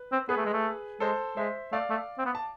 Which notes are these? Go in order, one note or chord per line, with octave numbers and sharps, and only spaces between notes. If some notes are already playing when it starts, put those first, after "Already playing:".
Already playing: B4
C4
B3 G#4 B4
A3
G#3
A3
G#3 A4 C5
G#3 C5 E5
A3 D5 F5
A3
C4
B3
A5